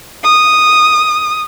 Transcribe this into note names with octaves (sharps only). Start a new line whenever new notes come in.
D#6